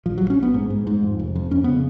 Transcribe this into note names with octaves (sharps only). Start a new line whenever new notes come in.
A#1 F3
A#1 F#3
C#4
A#1 B3
G#2
G#2
G#2
F2
F1
F2
F2 C#4
C#3 B3